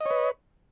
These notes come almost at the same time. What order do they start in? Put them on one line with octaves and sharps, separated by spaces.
D#5 C#5 B4